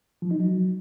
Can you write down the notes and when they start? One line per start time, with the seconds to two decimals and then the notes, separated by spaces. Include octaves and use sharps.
0.22 F3
0.31 D#4
0.40 F#3